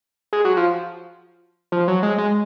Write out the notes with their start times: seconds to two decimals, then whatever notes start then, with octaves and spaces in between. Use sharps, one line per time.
0.33 G#3
0.45 F#3
0.57 F3
1.72 F3
1.88 F#3
2.03 G#3
2.18 G#3